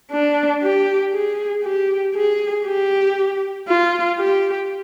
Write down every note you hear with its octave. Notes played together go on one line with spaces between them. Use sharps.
D4
G4
G#4
G4
G#4
G4
F4
G4